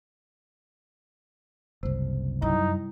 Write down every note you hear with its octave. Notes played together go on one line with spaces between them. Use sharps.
F#1 C2 C3 C5
F#2 G3 D#4 E4